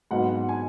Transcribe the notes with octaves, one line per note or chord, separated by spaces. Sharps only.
G#2 F#3 B3 D#4 F#5
F#5
G#5